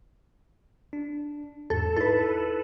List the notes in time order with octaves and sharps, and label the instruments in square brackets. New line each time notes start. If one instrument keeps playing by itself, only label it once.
[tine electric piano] D4
[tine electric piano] E2 G#2 [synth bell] A4
[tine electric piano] D#4 E4 [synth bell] A4 B4